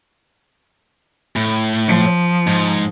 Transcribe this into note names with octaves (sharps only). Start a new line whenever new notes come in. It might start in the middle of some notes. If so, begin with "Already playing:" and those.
A2
F3
G#2